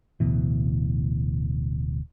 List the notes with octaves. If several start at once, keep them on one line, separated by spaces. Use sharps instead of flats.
D1 D2 B2 E3